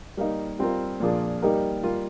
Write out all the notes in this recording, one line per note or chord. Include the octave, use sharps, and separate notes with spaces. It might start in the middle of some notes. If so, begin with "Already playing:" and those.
G3 A#3 D#4
G3 C4 F4 A#4
A#2 F3 A#3 D4 G#4
G3 A#3 D#4 G4 A#4
G3 A#3 F4